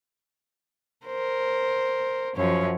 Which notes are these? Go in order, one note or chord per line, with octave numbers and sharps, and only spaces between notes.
A#4 C5
F#2 F3 C#5